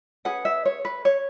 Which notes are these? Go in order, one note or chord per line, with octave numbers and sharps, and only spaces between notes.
C#4 G#4 B4 F#5
E5
C#5
B4
C#5